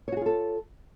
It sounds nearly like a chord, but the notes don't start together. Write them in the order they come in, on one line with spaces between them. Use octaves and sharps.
C#5 F#4 G#4 F4 A4